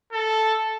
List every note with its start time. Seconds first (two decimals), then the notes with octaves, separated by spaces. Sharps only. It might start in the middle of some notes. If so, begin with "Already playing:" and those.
0.13 A4